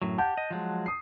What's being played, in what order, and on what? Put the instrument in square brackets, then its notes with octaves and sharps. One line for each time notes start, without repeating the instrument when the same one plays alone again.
[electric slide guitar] F#2 A2 F#3
[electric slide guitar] G4 [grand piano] F#5 A5 G6
[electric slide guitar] D#5
F3 F#3 G#3
[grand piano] D#6 C7